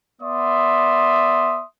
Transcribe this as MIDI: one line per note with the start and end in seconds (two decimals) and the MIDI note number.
0.22 1.64 59
0.22 1.64 74
0.22 1.64 76
0.22 1.64 84
0.22 1.64 87